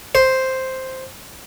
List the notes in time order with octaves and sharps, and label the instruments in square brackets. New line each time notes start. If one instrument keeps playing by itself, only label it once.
[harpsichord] C5